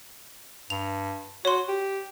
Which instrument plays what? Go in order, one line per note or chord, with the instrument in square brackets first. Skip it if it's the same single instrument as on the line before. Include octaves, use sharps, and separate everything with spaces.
[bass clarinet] G2 [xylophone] F7
[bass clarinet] F#4 [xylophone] C#5 C6
[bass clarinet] G4